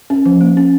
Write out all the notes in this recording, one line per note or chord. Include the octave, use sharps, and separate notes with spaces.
C#4
F3
A#3
C#4